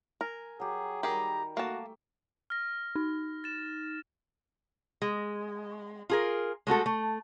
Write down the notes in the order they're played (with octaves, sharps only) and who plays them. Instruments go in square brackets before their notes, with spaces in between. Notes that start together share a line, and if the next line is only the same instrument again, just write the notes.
[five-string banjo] A#4 [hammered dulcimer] G#5
[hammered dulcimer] F#3 G4 [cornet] G#4
[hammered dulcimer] D#3 G3 [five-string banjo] G4 G#4 [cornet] A#5
[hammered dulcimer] A3 [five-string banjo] A#3 A5 [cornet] F#4
[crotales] F6 A#6
[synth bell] D#4
[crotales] A6 E7
[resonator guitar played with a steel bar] G#3
F4 G#4 A#4
G#3 A3 F#4 A4
A3